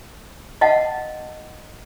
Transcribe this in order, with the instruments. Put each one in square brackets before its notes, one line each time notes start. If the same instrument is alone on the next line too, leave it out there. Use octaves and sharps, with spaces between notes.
[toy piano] D#5 F5 F#5 A5